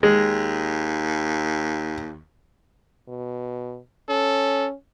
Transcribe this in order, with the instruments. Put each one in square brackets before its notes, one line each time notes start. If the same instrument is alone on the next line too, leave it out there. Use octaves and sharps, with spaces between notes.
[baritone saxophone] D#2 [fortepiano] G#3
[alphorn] B2
[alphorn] C#4 [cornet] A4